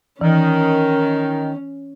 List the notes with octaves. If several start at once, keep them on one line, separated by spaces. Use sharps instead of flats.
D#3 E3 C#4